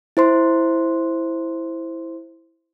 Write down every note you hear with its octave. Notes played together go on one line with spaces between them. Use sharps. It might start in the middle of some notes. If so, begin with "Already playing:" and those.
E4 C5 C6